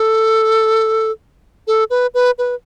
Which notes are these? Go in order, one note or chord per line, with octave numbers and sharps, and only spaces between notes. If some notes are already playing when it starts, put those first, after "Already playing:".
Already playing: A4
A4
B4
B4
B4